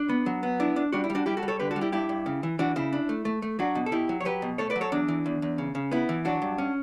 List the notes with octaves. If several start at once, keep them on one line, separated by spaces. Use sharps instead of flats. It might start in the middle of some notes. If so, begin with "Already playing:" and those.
Already playing: D4
B3
F#3
B3
D4 E4
D4
G3 D4 F#4
E4
G3
D4 F#4
G3 E4 G4
F#4 A4
G3
A4 C#5
D3 G4 B4
F#4 A4
G3
E4 G4
G2 E4 G4
G2
C#3
E3
E3 D4 F#4
C#3 E4
D4
A3
A3
A3
F#3 D4 F#4
B2
A4
B2 E4 G4
F#3
C#5
F#3 G4 B4
B2
A3 A4 C#5
B4 D5
F#3
A4 C#5
E2 D4
E3
E2
E2
C#3
C#3
B3 E4
E3
F#3 D4 F#4
G2
C#4